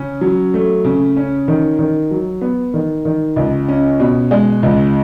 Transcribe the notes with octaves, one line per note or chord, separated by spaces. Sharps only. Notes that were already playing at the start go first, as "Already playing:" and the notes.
Already playing: C#3 C#4
F#3
A3
C#3
C#4
D#3
D#3
F#3
B3
D#3
D#3
C#2
C#4
B2
G#3
C#2